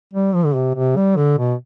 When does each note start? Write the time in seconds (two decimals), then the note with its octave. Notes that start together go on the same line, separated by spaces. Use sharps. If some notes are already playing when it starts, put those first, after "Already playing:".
0.13 G3
0.34 F3
0.45 D3
0.55 C3
0.75 C3
0.96 G3
1.16 D3
1.38 B2